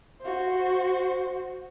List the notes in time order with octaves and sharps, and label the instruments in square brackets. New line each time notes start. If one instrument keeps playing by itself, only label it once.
[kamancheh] F#4 C5